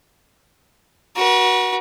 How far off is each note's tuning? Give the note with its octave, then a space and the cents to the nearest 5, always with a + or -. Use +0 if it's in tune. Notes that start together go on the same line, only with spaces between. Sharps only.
F#4 +0 B4 -45